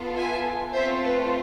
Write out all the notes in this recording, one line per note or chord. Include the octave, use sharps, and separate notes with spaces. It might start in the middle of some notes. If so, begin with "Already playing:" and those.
Already playing: B3 F4 A4
E5 G#5
A3 C4 F4 A4 C5 E5
B4